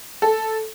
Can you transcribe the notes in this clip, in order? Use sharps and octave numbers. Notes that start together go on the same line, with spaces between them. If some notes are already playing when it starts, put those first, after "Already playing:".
A4